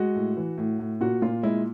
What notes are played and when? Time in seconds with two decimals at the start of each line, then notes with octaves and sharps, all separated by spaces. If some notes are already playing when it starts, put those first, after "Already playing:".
Already playing: G#3 F#4
0.15 A2
0.37 E3
0.58 A2
0.79 A2
1.01 A#2 F#4
1.22 A#2 F4
1.43 G#3 E4